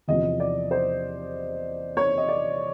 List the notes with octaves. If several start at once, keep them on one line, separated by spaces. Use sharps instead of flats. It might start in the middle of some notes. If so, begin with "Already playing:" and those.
E2 C3 F3 D#5
D5
C5
C#5
D#5
D5